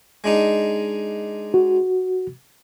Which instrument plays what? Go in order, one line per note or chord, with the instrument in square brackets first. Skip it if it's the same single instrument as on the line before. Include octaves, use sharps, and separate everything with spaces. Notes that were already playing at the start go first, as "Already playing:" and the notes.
[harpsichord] G#3 D4 D#4
[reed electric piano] F#4